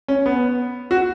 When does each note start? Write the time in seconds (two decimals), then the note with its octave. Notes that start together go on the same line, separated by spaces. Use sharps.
0.08 C#4
0.26 B3
0.91 F#4